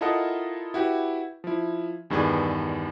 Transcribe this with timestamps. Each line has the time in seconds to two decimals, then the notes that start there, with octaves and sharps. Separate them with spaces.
0.01 E4 F4 A4 A#4 D#5 F#5
0.74 E4 F#4 G4 B4
1.44 F3 E4
2.10 E2 G2 D#3 G#4 B4 D5